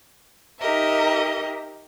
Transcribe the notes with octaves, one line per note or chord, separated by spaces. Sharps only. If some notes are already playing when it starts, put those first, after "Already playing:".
D#4 G4 A#4 D#5 E5